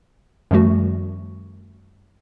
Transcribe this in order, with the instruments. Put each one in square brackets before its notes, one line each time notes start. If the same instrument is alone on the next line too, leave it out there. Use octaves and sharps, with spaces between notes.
[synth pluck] F#2 D#3 F3 G3 A3 F#4